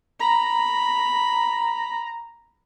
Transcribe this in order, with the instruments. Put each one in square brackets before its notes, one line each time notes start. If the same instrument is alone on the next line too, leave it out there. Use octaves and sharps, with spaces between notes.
[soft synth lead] A#5 [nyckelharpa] B5